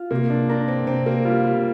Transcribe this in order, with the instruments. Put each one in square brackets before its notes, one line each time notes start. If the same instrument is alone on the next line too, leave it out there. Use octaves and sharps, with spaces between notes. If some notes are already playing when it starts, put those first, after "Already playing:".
Already playing: [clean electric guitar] F4
[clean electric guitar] C3 [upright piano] A#3
[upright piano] D4
[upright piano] D4 [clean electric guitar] A#4
[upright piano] C4
[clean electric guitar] C3 [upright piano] C4
[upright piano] A#3
[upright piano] G3 [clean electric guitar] F4
[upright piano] G3